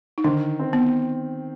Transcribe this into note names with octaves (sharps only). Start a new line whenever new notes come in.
D#4
D3 D#3 D4
C4
B3